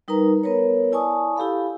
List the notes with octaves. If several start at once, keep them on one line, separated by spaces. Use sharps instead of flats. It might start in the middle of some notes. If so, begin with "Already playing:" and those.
G3 D#4 A#4 B4 A#5
B3 A#4 B4 C#5
E4 D5 G#5 A5 C#6 D#6
E4 G4 A4 F5 B5